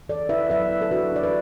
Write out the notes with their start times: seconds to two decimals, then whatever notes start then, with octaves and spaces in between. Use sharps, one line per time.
0.09 E3 A4 D5
0.29 E4 B4 E5
0.50 F#3 B4 E5
0.71 F#3
0.82 A4
0.91 D4 F#4 B4
1.12 D4 D5
1.24 B4